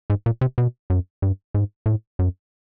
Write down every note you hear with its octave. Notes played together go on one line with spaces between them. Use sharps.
G#2
A#2
C3
B2
F#2
G2
G#2
A2
F#2